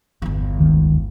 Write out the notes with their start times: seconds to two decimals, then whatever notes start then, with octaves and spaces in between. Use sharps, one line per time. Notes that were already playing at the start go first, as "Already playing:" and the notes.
0.22 G1 E2
0.58 D2 D#3 G#3